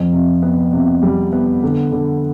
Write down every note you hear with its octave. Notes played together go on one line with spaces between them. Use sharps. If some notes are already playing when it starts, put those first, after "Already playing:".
Already playing: F2
C3
B3
C3
G3
B3
D3
D3